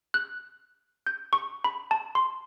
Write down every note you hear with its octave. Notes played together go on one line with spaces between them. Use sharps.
F#6
G6
C#6
B5
A5
C6